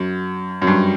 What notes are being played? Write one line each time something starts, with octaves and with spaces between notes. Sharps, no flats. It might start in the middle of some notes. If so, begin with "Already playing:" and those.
Already playing: F#2
F#2
G2